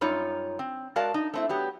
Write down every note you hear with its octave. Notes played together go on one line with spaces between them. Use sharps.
F#2 G3 D#4 F4 C#5
C4
G#3 F#4 A#4 D5 F5 A5
D#4
A3 C4 E4
F#3 B3 G4